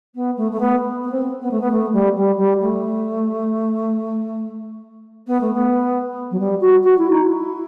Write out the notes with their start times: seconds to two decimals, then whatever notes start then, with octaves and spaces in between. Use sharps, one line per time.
0.15 B3
0.37 A3
0.51 A3
0.59 B3
1.03 B3
1.11 C4
1.41 B3
1.51 A3
1.60 B3
1.71 A3
1.93 G3
2.16 G3
2.37 G3
2.60 A3
5.27 B3
5.40 A3
5.53 B3
6.31 F#3
6.39 G3
6.60 F#4
6.83 F#4
6.98 E4
7.10 D#4
7.24 E4